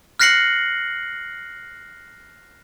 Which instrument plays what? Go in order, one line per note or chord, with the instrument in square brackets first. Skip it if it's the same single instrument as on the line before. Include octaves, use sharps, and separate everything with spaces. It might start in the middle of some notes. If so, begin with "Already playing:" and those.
[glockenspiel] F6 F#6 A#6 C7 C#7 F#7